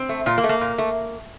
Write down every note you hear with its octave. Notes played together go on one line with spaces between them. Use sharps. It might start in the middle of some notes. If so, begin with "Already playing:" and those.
Already playing: C4
A3
A#2 F4
A#3
A3
A#3
A#2
A3